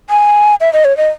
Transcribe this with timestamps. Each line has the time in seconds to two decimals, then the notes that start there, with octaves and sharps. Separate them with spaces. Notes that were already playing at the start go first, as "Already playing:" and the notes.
0.10 G#5
0.61 E5
0.73 D#5
0.85 C#5
0.97 D#5